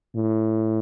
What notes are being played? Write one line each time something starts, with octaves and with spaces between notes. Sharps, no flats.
A2